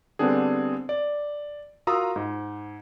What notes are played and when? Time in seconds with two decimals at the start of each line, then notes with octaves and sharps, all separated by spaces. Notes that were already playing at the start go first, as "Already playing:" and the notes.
0.19 D3 G3 B3 C4 D4 G#4
0.89 D5
1.87 F4 F#4 A#4 A#5 D#6 E6
2.16 G#2